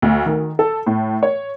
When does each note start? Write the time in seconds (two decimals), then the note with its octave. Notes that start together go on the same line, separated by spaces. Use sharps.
0.02 D2
0.26 D#3
0.59 A4
0.87 A2
1.23 C#5